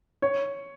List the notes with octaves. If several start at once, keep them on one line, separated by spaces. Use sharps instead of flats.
C#5